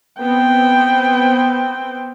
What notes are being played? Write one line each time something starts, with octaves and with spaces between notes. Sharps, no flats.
B3 C4 G5